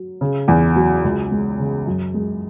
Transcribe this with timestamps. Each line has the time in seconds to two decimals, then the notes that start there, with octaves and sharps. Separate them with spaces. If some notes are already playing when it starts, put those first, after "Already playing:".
Already playing: F#3
0.21 C#3
0.48 E2
0.76 F#3
1.04 C#2
1.31 G#3
1.59 C#3
1.86 F#2
2.14 G#3